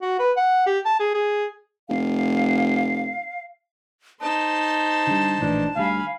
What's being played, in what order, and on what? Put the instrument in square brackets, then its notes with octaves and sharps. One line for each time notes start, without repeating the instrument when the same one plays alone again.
[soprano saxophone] F#4
B4
F#5
G4
A5
G#4
G#4
[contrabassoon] F1 [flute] F5
[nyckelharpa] D#4 C5 [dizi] A5
[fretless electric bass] D3 G3
[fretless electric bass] A#1 A2 E3 [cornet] D4
[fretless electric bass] D2 G3 [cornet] F5 [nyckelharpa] G#5 B5